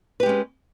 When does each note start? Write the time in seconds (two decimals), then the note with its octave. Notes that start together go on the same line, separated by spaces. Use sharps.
0.20 B4
0.23 G4
0.26 G#3
0.29 C#4